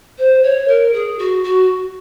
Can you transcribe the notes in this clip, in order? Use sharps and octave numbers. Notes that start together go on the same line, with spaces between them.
C5
C#5
A#4
G#4
F#4
F#4